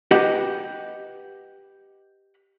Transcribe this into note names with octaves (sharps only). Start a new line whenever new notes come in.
G4 B4 D#5 F#5